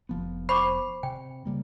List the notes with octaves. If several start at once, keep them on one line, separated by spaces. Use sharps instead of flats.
F1 F3 B3
C5 B5 C#6 D6
C3 G5
C#3 G3 A#3